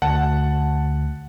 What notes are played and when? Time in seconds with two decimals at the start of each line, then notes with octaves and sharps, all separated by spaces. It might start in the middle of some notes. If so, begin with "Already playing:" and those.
0.02 D2 F#5 A5